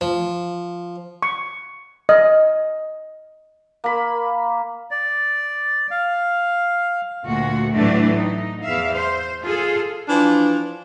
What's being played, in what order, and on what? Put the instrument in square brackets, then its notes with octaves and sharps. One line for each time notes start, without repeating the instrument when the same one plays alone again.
[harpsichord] F3
[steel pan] C#6
D#5
[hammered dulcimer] A#3 B5
[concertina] D5
F5
[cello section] D2 A#2 F#4
A2 E3 F#3 A3 D4
D#4
E2 E5 F5
C5
F4 G#4 A4
[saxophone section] E3 F3 D4